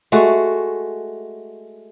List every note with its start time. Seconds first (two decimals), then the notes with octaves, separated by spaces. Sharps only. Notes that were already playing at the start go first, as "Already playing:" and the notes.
0.12 G#3 A3 F#4